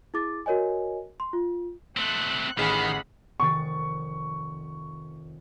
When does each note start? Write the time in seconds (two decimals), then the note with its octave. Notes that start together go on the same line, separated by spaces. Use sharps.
0.14 E4 G#4 D6 A6
0.46 F#4 A#4 C#5 D#5 G#5
1.20 C6
1.33 F4
1.97 A3 C4 F#6
2.59 A1 D#3 G#4 F#5 B5 B6 C7
3.40 F1 D#3 C#6 A6